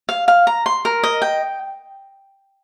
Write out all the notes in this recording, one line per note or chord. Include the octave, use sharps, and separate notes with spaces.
F5
F5
A#5
C6
A#4
D#5
G5